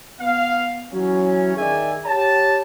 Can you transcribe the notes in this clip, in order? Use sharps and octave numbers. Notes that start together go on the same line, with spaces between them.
B3 F5
E3 F#3 C#4
D#3 G#4 D5 E5 G#5
G4 C#5 A5